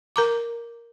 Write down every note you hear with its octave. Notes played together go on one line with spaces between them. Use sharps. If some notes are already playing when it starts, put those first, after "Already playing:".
A#4 A#5 D6